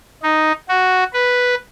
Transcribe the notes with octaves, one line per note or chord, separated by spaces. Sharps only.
D#4
F#4
B4